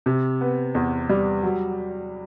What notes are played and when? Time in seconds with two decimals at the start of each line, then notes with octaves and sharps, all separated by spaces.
0.06 C3
0.41 B3
0.75 E2
1.09 G3
1.43 F#3